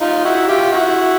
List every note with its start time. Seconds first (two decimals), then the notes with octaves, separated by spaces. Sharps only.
0.01 D#4 F4
0.25 E4 F#4
0.48 F4 G4
0.72 E4 F#4